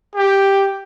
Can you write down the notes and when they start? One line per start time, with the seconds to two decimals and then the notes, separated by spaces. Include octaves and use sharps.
0.16 G4